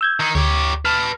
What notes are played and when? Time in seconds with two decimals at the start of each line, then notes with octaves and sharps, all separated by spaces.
0.01 E6 G6 G#6
0.20 D#3 D#4
0.35 D2 G4 C#5
0.85 B4 A5 F6